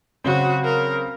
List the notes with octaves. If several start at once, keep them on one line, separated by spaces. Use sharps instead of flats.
C#3 F#3 C4 F#4
A#4